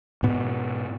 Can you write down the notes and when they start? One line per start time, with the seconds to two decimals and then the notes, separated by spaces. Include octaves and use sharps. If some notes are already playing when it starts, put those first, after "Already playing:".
0.23 G#2 B2 B3